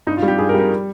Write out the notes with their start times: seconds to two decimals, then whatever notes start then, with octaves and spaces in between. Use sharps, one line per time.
0.07 G2 D#4
0.17 F4
0.22 G3
0.28 G4
0.38 G2 G#4
0.49 A#4
0.54 G3
0.59 A#4